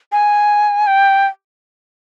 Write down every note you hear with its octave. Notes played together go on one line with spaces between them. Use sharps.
G#5
G5